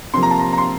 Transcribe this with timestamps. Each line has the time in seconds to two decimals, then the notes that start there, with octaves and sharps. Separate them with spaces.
0.14 C3 F3 A#3 C6
0.23 A#5
0.31 A5
0.39 A#5
0.53 A#5
0.58 C6